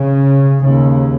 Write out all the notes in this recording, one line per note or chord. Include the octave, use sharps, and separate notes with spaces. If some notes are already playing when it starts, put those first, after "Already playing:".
Already playing: C#3
D#2 C#3